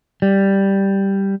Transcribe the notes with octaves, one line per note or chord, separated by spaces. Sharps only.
G3